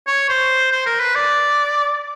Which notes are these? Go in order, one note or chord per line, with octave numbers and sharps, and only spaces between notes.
C#5
C5
C5
A#4
B4
D5